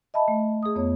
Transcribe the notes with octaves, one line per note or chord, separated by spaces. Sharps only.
D#5 E5 A5 B5
A3
G#4 D#6
F2 B3 C#5